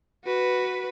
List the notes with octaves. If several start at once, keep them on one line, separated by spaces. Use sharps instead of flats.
F#4 B4